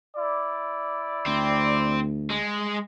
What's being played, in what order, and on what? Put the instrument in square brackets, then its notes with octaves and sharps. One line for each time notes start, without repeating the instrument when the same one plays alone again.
[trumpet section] E4 D5
[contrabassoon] D2 [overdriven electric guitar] C4
[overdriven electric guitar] G#3